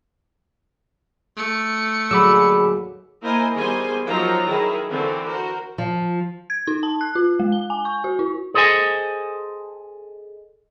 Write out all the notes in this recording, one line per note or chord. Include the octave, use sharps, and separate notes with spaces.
A3 C#7
D#2 D3 F#3 G#4 B5 D6 E6
A#3 E4 A#4 C5 D#5 G#5
D#3 G3 B3 G#4 C5 G#5
F3 F#3 D#4 F4 A#4 A#5
D#3 E4 G#4 A#4
D3 E3 C4 D4 F#4
F#4 A#4 C5
F3
G#6
D#4
A5
F#6
F4
G#3
G7
G#5
C#6
F#4
E4
G#4 A4 C5 D#5 G#5